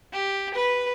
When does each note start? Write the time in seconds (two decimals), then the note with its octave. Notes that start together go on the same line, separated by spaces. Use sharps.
0.13 G4
0.54 B4